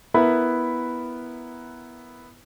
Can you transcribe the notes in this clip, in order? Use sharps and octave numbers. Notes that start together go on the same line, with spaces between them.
B3 E4 A#4 B4 B5